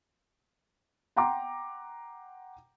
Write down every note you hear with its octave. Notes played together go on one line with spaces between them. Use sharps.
F#5 G5 A#5 C6 D6